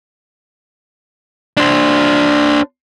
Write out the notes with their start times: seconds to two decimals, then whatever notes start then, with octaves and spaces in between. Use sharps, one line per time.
1.57 D4 C5